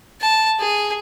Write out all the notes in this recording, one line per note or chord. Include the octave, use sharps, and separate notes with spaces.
A5
G#4